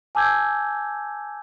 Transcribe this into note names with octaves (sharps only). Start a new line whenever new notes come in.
G#5 A5 D6 E6 G6 G#6